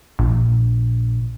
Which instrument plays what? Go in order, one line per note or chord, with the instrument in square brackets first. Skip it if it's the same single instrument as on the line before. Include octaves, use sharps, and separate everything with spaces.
[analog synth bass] A#1